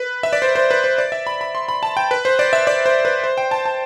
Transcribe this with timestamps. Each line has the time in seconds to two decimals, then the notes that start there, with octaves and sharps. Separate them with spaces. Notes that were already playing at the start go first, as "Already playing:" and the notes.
Already playing: B4
0.23 E5
0.33 D5
0.42 C5
0.55 C5
0.71 B4
0.84 C5
0.98 D5
1.12 E5
1.27 B5
1.41 B5
1.55 C6
1.69 B5
1.83 A5
1.97 G5
2.11 B4
2.25 C5
2.39 D5
2.53 E5
2.67 D5
2.86 C5
3.05 B4
3.24 C5
3.38 G5
3.51 A5
3.65 A5